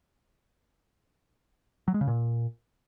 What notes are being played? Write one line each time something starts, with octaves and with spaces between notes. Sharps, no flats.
F#3
G#3
C#3
A#2